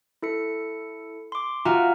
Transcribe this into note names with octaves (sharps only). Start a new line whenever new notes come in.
E4 A4 C#7
C6 D6
F4 F#4 E5 G#5 A#5